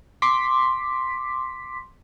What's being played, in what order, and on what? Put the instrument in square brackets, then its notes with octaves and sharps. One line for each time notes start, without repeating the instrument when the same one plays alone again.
[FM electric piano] C6 D6 B6